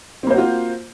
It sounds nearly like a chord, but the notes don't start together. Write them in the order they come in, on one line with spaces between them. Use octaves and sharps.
C4 A#3 C5 F#4 F4